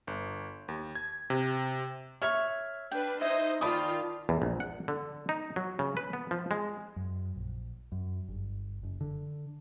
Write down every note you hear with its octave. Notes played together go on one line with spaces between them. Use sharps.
G1
D#2
G#6
C3
C#5 E5 C#6 F6
D4 B4 G5
D#4 E4 C5 D#5
D#3 F4 D5 G5 A5 B5 D#6
E2
A#1
F#5
D3
D#4
F#3
C#3
B4
B3
F3
G#3
F#2
A#1
F#2
G1
F#1
D3